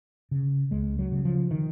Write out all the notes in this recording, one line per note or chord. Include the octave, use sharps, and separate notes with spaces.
C#3
C#2 G#3
F#3
C#3
F3
D#3